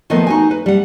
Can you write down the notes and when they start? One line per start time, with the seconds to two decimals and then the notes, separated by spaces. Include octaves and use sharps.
0.10 D#3 F3 A3 B3 D#5
0.27 D#4 F#4 G#5
0.51 B4
0.66 G3 F#5